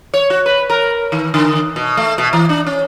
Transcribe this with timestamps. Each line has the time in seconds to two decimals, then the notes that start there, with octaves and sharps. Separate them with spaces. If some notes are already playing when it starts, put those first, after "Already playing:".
0.14 C#5
0.30 F#4
0.46 B4
0.70 A#4
1.12 D#3
1.34 D3
1.76 B2
1.97 A3
2.18 B2
2.33 E3
2.49 D4
2.66 C#4